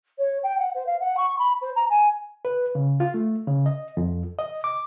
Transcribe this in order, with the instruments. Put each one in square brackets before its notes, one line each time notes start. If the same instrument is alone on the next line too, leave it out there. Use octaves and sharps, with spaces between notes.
[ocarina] C#5
G5
F#5
C5
F5
F#5
C#6
B5
C5
A#5
G#5
[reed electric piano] B4
C#3
F4
A3
C#3
D#5
F2
D#5
D6